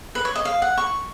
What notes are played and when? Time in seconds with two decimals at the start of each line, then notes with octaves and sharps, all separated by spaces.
0.15 B4
0.25 C#5
0.36 D#5
0.45 F5
0.62 F#5
0.78 C#6